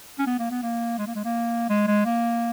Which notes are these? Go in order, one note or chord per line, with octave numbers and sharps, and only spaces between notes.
C#4
B3
A#3
B3
A#3
G#3
A#3
G#3
A#3
G#3
G#3
A#3